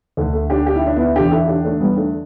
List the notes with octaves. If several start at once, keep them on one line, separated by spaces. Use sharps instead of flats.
D2 D3
A3
D4 G4
G4
E4
D4
B3 E4
E2 D3 D4 G4
E4 A4
D4 G4
A3 D4
G3 B3
A3 D4